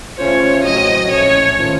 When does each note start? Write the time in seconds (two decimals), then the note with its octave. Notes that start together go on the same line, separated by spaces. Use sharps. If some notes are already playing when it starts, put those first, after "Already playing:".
0.17 C#3 A3 C#4 F4 C5 C#5
0.63 A1 A2 F#3 C4 F#4 D#5
1.10 A#1 A2 A3 C#4 C#5
1.57 D#3 A3 C#4 F4 C5